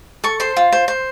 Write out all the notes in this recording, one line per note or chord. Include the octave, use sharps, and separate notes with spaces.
A4 C#6
C5 C6
F4
C5
C5